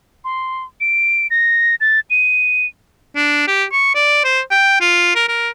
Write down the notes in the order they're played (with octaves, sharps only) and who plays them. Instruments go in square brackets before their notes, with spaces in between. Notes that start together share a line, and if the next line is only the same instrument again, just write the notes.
[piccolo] C6
D7
A#6
A6
D#7
[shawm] D4
G4
C#6
D5
C5
G5
F4
A#4
A#4